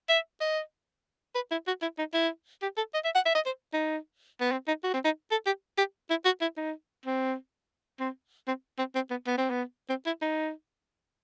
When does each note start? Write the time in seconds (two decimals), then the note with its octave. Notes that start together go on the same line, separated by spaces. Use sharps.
0.09 E5
0.41 D#5
1.35 B4
1.51 E4
1.67 F#4
1.82 E4
1.99 D#4
2.14 E4
2.62 G4
2.77 A4
2.94 D#5
3.05 E5
3.15 F#5
3.26 E5
3.35 D#5
3.46 C5
3.73 D#4
4.41 B3
4.52 C4
4.67 D#4
4.84 F#4
4.94 C4
5.05 D#4
5.31 A4
5.46 G4
5.78 G4
6.10 E4
6.25 F#4
6.41 E4
6.57 D#4
7.06 C4
8.00 C4
8.48 C4
8.79 C4
8.95 C4
9.11 B3
9.27 B3
9.38 C4
9.50 B3
9.89 C4
10.06 E4
10.22 D#4